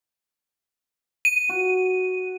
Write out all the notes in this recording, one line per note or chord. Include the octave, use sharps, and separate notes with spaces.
D#7
F#4